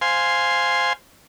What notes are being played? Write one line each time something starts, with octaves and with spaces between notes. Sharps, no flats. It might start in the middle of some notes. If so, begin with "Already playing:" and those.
C5 F5 G#5 C6